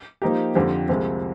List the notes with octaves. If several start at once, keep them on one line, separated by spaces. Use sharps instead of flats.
F3 A#3 D#4 G4
F2 D3 F3 C4 G4
C2 C3 F3 G#3